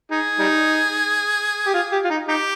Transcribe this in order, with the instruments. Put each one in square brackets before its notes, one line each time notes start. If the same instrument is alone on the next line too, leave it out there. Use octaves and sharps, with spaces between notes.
[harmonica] D#4 [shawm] G#4
[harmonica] G3 D#4
G4
F4
G4
F4
D#4
[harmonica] D#4 [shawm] G4